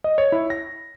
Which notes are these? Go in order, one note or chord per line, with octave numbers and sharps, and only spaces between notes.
D#5
C#5
E4
A#6